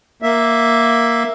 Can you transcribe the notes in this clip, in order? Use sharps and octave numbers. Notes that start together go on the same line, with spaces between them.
A#3 E5